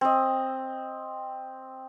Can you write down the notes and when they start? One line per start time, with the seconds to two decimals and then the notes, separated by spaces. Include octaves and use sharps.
0.01 C4 D#5